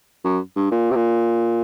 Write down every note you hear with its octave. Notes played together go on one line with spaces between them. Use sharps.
F#2
G2
A#2
C3
A#2